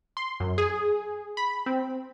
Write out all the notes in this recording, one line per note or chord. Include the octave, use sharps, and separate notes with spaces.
C6
F#2
G#4
B5
C4